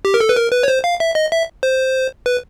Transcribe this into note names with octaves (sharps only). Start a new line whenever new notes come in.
G4
A#4
A4
B4
A#4
B4
C#5
C5
F5
E5
D#5
E5
C5
B4